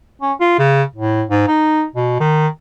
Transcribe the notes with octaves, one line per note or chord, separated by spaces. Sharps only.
C#4
F4
C#3
A2
G#2
D#4
B2
D#3